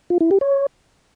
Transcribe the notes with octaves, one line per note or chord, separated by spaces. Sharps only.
F4
E4
G4
C#5